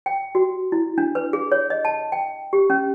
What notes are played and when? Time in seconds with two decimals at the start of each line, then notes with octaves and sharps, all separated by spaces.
0.06 G5
0.35 F#4
0.72 E4
0.98 D4
1.15 B4
1.33 G#4
1.52 C#5
1.70 D#5
1.85 A5
2.12 G5
2.53 G4
2.70 C#4